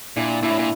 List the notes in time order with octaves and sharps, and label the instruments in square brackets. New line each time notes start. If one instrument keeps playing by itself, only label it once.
[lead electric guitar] A#2 [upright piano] D4 E4
[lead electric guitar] A#2 [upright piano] D4 E4
[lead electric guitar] A2
A#2